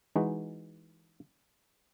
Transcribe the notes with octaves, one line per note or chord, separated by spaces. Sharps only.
E3 G#3 D#4 F#4